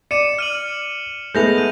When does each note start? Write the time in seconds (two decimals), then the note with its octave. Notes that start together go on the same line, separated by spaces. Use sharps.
0.11 D5 C#7 D#7 E7
0.39 F6 D#7 F#7
1.35 G#3 A3 B3 G6 A#6 F7
1.58 D#7